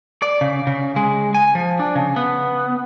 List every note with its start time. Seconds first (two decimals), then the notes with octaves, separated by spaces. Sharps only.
0.22 D5
0.41 C#3
0.67 C#3
0.96 G#3
1.35 G#5
1.55 F3
1.79 D4
1.95 C#3
2.16 B3